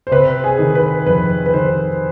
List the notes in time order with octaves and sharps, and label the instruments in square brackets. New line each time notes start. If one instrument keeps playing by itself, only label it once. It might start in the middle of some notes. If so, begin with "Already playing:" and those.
[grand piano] C5
C3 B4
G#4
D#3
B4
F2 B4
B4
D#3 C5